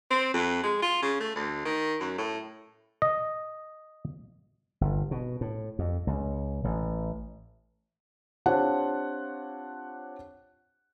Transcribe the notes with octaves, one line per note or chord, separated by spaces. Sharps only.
C4
F2
G#3
F4
C#3
A3
D2
D#3
F#2
A2
D#5
G1
B2
A2
F2
C#2
A1
C4 D4 F4 G4 C#5 F#5